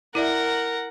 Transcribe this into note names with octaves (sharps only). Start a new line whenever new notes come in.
E4 A#4 D5 E5 F#5